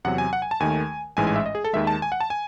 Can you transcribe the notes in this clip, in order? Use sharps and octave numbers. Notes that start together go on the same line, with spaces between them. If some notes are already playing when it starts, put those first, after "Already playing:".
E2 C3 F#3 F#5
G#5
F#5
G#5
A5
D#2 D#3 A3 G#5
A1 G#2 E3 G#3 G#5
G#5
E5
D#5
G#4
A4
D#2 D#3 G#3 E5
A5
G#5
F#5
A5
G#5